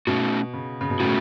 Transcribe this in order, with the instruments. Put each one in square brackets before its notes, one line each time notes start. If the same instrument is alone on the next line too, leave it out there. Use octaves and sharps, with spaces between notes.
[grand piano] B2 [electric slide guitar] A3 C#4 F#4
[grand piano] C#3
C#3
B2
[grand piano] A2 [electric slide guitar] A3 C#4 F#4